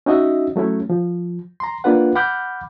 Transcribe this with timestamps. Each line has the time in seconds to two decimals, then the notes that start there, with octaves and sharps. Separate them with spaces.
0.06 C#4 D#4 F#4 D#5 E5
0.56 F#3 A3 C#4 E4
0.90 F3
1.60 A#5 C6
1.84 A#3 D4 F4 B4 F#5
2.16 F#5 B5 D6 F6 G6